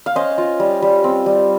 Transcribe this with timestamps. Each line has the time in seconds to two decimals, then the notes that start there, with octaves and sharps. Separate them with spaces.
0.06 F5
0.16 C#4 C5 D#5
0.38 F4
0.60 G3
0.82 G3
1.04 C4
1.26 G3